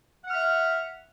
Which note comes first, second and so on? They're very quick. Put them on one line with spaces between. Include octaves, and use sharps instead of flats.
F#5 F6 E5